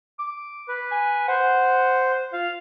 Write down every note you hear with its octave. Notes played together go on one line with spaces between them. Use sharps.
D6
B4
G#5
C5 F#5
F4 F5